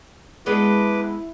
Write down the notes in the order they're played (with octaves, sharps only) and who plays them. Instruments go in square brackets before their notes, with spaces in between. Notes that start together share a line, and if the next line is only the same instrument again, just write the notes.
[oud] G#3 B3 D4 [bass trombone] E4 [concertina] B4 D6